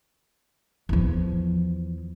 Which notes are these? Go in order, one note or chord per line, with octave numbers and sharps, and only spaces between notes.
E2 F3